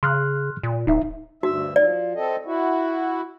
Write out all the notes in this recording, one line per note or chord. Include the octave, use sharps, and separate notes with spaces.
C#3 C6 F6 F#6
A#2
D1 D#4 E5
D2 G2 F#4 E5
F3 D5
C4 A4 D#5
E4 F#4